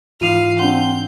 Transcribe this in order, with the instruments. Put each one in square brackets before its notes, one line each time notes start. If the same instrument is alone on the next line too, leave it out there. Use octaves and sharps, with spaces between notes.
[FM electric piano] G#2 E3 D#4 [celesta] F4 D#7 F7 [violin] F5
[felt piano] C4 D4 F#5 [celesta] C6 [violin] G6